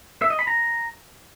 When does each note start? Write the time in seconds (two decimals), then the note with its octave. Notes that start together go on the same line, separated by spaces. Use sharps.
0.22 E5
0.30 D#5
0.39 B5
0.47 A#5